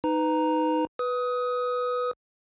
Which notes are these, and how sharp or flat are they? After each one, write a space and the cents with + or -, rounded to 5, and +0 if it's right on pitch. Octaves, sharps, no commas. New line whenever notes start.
D#4 +0 B4 +20 A#5 +0
B4 +0 D#6 +20